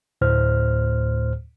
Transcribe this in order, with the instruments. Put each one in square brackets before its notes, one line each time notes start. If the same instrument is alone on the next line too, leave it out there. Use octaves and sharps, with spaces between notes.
[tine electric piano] D2 A2 C5 F6